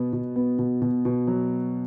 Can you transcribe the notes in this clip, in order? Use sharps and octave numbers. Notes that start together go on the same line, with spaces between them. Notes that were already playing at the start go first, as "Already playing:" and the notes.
Already playing: B2 B3
B2
B3
B2
B2
B2
F#3